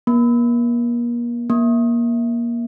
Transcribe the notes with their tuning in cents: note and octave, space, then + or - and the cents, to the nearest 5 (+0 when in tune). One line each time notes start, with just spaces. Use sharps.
A#3 +40
A#3 +20